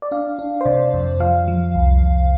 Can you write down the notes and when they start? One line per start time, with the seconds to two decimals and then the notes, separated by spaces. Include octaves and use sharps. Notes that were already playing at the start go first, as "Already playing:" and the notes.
0.02 D5
0.11 D4 F5
0.39 D4
0.61 C5
0.66 C3 D5
0.94 F2
1.20 F3 F5
1.48 F3
1.75 C2
2.02 C2